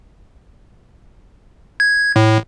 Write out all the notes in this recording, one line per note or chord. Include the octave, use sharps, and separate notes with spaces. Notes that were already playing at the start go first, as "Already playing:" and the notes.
G#6
A2